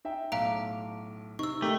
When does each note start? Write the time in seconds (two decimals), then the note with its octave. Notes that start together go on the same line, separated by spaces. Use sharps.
0.05 D#4 E5 G5
0.32 B1 A2 E5 F5 A#5 D6
1.39 C3 D#4 C#6 E6
1.62 C3 A3 G4 A#4 D#5